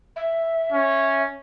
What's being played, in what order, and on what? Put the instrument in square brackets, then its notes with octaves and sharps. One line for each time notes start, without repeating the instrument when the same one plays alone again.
[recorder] E5
[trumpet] C#4